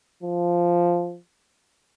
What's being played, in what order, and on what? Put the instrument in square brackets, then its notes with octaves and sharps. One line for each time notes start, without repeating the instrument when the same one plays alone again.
[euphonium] F3